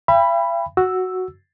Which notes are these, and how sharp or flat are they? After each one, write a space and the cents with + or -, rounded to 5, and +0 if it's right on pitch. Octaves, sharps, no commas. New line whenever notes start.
E5 +45 G5 +30 B5 +0
F#4 +0 E6 +0